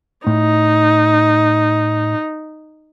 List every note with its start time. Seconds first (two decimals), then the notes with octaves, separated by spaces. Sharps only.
0.27 A2 D#4